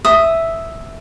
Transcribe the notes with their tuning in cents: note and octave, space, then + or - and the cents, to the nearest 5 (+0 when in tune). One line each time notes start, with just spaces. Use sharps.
E5 +0 D#6 +0